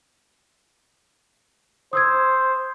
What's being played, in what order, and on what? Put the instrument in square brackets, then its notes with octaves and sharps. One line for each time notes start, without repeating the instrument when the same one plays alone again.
[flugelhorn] C5 [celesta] D#6 E6 G#6